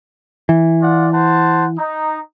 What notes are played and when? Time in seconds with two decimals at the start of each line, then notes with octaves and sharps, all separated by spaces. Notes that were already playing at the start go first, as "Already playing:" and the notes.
0.49 E3
0.82 F4 D5 F#5
1.13 C5 F#5 A5
1.78 D#4